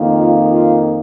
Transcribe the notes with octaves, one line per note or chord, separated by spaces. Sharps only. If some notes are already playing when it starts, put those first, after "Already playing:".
Already playing: F2 D#3 A#3
F4
F4